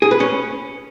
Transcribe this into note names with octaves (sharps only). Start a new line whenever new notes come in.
G#4
B4
C#4